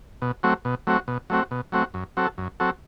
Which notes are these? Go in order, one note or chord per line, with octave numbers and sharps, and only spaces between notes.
B2
F#3 A3 C4 F#4
B2
F#3 A3 C4 F#4
B2
F#3 A3 C4 F#4
B2
F#3 A3 C4 F#4
F#2
F#3 C4 F#4 A4
F#2
F#3 C4 F#4 A4